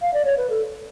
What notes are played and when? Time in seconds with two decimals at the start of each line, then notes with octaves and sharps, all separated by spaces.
0.02 F5
0.14 D5
0.25 C#5
0.37 B4
0.50 A4